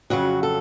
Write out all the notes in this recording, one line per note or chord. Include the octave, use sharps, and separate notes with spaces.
F2 C#3 F#3 F#4
A4